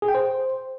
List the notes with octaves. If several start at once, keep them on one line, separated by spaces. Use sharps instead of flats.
G#4
G5
C5